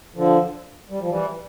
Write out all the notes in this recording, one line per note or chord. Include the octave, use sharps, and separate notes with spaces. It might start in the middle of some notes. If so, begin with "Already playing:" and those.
D3 F3
G3
F3
E3 G3